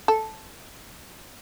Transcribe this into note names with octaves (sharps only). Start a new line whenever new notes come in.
A4